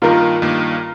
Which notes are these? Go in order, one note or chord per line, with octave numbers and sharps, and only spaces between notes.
G2 D#3 A#3 F4 A#4
G2 D#3 A#3